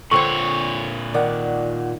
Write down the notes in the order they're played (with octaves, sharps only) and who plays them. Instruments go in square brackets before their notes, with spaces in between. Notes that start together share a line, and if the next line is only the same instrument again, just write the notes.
[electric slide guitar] A#2 C#5 [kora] D3 C4 C5 [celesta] C#6
[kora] D#3 [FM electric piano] D5 F#5